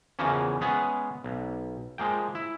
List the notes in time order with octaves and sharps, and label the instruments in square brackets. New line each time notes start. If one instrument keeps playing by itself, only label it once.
[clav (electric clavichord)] E2 C#3 E3 F3 A#3 C#4
G#3 B3 C#4 G#4
B1
F3 G#3 A#3 G5
E4